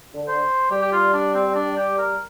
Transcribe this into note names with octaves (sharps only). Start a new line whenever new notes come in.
D3
C5
G3 G4
G4
F4
D4
C4
D4
G4
A#4